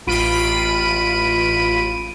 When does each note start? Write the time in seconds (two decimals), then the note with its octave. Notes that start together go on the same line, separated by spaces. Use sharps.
0.07 A1 F4 B5 D7 D#7